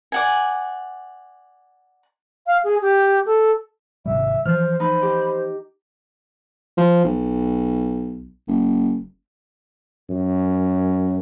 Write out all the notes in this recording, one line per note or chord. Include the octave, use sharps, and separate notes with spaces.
D5 F#5 G#5
F5
G#4
G4
A4
G#1 C3 G3 E5
E3 F3 C5 F6
D#4 C5 B5
G4
F3
B1
F#1
F#2